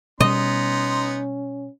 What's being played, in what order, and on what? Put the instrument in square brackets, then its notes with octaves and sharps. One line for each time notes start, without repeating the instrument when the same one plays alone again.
[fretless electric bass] B2 G3 [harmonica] B3 D#4 C6 [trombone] C#4 [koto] D#5